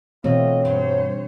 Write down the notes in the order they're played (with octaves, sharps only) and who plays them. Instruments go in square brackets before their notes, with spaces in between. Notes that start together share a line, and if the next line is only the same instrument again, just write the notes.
[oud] D2 A3 [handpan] B2 E3 C4 [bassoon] F#3 [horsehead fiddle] F4 D#5
[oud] G2 [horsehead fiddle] C5 C#5